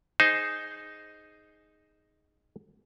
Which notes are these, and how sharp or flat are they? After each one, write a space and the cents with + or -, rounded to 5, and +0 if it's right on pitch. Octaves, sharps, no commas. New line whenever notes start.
D#4 +0 G#4 +0 C5 +0